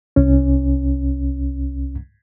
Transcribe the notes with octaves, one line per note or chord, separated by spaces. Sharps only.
C2 C#4